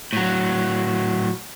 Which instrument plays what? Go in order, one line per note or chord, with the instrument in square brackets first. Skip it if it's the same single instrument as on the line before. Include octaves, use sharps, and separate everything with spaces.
[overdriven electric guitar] A2 F#3